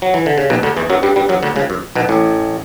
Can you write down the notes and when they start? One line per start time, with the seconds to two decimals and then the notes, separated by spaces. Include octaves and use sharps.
0.02 F#3
0.14 E3
0.26 D3
0.38 C#3
0.50 B1 B2
0.63 D2 D3
0.77 E2 E3
0.90 F#2 F#3
1.03 G2 G3
1.16 G2 G3
1.29 F#2 F#3
1.43 D2 D3
1.56 C#2 C#3
1.70 F#2
1.95 B1 B2
2.09 A1 A2